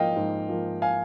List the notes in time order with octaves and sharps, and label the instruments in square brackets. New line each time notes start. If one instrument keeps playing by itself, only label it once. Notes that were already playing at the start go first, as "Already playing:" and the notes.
Already playing: [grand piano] G#2 F3 A#3 D#5 F5 G5
G#2
F3 A#3
F5 G#5